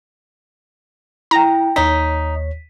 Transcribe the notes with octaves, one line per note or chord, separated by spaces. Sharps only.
E4 G5 A#5
D#2 D#4 C#5 B6